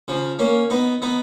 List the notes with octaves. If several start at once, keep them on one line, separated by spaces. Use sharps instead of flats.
C#3 F3
A#3 C#4
B3 D#4
B3 D#4